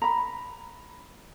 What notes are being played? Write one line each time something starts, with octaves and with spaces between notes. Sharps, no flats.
A#5 B5